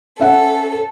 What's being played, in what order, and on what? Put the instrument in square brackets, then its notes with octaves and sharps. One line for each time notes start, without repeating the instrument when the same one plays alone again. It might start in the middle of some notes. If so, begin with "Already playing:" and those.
[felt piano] C#4 E5 F#5 [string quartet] A4